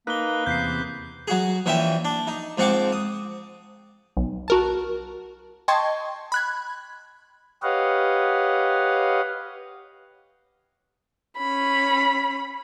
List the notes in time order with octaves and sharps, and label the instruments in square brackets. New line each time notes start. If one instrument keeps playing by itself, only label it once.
[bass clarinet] A#3 [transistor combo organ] D#4 A#4 B4 [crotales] F#6 G7
[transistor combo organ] E2 C3 B3 [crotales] G6 B6 C7
[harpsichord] F#3 F#4 G#4
A#1 E3 C#4 E5 G5
D4
D#4
G#2 F3 C4 F#5 C#6 D6
D#6
[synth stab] B1
F#4 A#4 A5
D#5 G5 A5 C6 C#6 G#6
B5 F#6 G#6
[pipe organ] G4 B4 C#5 D#5 F5 F#5
[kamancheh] C#4 B5